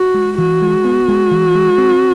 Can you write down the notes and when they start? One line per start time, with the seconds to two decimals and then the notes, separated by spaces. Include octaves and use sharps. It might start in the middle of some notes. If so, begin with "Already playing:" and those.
Already playing: F#4
0.14 G#3
0.38 E3 F#4
0.61 G#3
0.85 B3
1.08 G#3
1.31 E3
1.55 G#3
1.78 C4